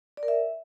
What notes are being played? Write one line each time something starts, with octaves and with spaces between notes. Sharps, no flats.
D5
A#4
E5